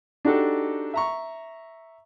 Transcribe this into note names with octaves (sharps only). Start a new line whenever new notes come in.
D4 D#4 F#4 G4 A4
E5 A#5 C#6